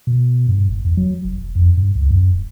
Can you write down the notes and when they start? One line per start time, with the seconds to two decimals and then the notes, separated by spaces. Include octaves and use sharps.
0.07 B2
0.48 G2
0.69 F#1
0.85 E2
0.97 F#3
1.25 F1
1.38 E1
1.55 F2
1.77 G2
1.95 C#2
2.11 F#2
2.33 D1